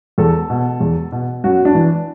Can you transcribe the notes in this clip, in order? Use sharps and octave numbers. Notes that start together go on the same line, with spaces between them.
E2 A4
B2
E2
B2
F#2 F#4
D4
E3